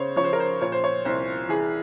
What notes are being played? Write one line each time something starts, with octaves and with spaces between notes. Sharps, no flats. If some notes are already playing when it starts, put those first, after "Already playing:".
Already playing: C#3 C5 C#5
F3 C#5
C5
A#4
C5
A#2 C#5
C5
C#5
C2 C5
E3 G#4